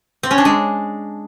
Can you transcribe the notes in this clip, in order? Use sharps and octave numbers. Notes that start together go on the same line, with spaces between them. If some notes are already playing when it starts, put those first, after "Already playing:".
C4
C#4
D4
G#3